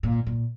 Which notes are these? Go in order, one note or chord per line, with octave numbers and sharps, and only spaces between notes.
A#2
A#2